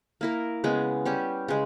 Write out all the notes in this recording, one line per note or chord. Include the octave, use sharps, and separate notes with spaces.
A#3 E4 A#4
C#3 G#3 B3
G3 C#4 G4
C#3 G#3